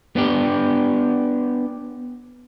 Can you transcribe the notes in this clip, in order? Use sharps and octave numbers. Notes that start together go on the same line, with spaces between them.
B3 D4 G4